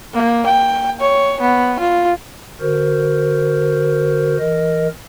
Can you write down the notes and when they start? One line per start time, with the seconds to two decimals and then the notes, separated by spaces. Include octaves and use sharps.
0.14 A#3
0.46 G5
1.00 C#5
1.40 B3
1.79 F4
2.60 D3 F#4 A#4 C5
4.38 E3 A#4 D#5